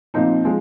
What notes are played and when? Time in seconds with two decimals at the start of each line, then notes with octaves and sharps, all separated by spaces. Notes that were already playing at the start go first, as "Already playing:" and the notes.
0.14 A#2 F3 C4 D#4
0.45 F3 G#3